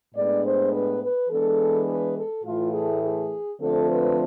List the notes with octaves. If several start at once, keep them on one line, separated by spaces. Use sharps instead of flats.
A2 G#3 B3 D4 D5
C5
B4
B4
E3 G#3 B3 D4 A4
B4
A4
A2 E3 A3 F4
G#4
G#4
D3 F3 A3 C4 A4
B4